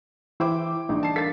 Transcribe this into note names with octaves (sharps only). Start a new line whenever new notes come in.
E3 E4 C5 E5 G5 D6
A#1 E3 G3 D4 D#4
A5 C7
A4 A#4 F5 A6 B6